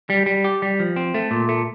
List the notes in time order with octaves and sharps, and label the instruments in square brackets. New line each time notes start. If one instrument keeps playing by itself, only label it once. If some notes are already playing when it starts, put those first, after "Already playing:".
[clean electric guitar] G3
G3
G4
G3
F3
C4
A3
A#2
A3